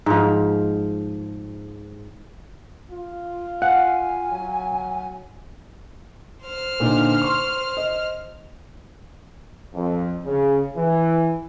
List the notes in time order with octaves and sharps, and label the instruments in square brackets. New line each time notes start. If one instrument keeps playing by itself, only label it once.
[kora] G#2 F3
[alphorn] F4
[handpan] F5 [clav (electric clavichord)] F#5 [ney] G#5
[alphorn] F#3
[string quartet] C5 F6
[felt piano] A#2 D3 D#4
C6 C#6
D#5
[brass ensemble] F2
C#3
E3